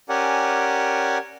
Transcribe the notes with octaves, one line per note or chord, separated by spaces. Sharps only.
C#4 G4 A#4 D5 F#5 G#5